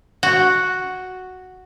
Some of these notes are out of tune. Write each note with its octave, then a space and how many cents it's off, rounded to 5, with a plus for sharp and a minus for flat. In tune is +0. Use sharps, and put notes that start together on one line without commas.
F#4 +0